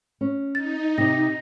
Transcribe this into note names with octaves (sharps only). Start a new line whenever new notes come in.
C#4
D#4 A6
C3 D#5 A#6